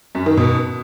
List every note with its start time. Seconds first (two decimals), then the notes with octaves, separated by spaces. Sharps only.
0.15 F#2
0.26 D#3
0.37 B2